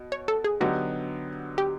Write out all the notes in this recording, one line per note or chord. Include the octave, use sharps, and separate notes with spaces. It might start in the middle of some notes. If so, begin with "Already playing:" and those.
Already playing: B2
C#5
A4
G#4
D3 F#3 B3 D#4 F#4 G4
G4